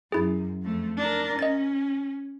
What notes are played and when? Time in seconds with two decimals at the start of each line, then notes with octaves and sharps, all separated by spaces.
0.12 F#2 E4 G#4
0.62 F2 A3
0.98 D4 A#4
1.39 C#4 D#5 A6